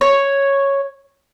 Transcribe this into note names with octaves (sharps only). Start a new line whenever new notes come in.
C#5